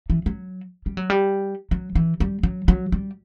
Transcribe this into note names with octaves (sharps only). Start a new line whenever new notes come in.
E3
F#3
G3
F#3
G3
F#3
E3
G3
F#3
F#3
G3